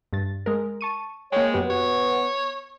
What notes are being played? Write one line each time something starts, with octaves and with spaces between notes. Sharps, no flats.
G2 A6
G#3 A#4
A5 C#6 D#7
G#3 A#3 C#5 G5
F#2 B3 G4 B4
F#4 C#5